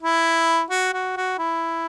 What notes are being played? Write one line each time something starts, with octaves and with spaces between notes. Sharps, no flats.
E4
F#4
F#4
F#4
E4